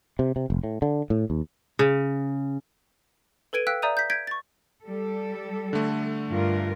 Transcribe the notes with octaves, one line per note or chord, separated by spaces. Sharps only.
C3
C3
F1
A2
D3
A2
D#2
C#3
A4 B4 G#6 D7 D#7
F5 G5 E6 F#6 B6 D7
D5 E5 A#5 D#6 G6 D#7
G6 B6
G6 G#6 A#6 B6 D7
C#6 A6
G3 A4
D3 A3
G2 F4 A#4